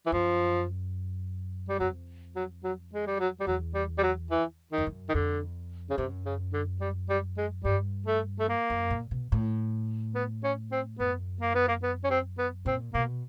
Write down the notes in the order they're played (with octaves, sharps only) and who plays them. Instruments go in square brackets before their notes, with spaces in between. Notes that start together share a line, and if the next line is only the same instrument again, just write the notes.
[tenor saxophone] E3
[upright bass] F#2 [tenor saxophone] F3
[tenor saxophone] G3
[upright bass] F2 [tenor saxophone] F#3
[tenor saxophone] F#3
F#3
G#3
G3
F#3
G3
[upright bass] E2 [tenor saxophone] F#3
[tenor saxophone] G3
G3
F#3
E3
D#3
[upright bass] F2
F#2
[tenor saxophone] D#3
[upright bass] F2 [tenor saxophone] D3
[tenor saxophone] C#3
[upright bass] F#2 [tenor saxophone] C3
[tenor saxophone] C#3
D3
G3
G3
G#3
[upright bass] G2 [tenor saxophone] G3
[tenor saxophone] A3
A3
A#3
[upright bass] F#2
A#2
B2
A2
[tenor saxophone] B3
C#4
C4
[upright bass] F#2 [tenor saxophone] B3
[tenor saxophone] A#3
B3
A#3
B3
C#4
C4
B3
[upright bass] A#2 [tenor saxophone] C4
[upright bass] B2 [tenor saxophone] A#3